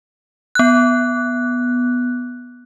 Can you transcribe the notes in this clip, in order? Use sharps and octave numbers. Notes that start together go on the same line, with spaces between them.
B3 F#6